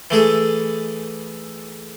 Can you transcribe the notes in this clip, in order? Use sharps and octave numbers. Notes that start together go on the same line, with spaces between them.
E3 A3 G#4 A4